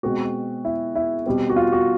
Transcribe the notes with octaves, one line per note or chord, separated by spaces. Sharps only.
B2 G#3 C4 F#4
E4
E4
B2 G3 C4
F#4
F4
F#4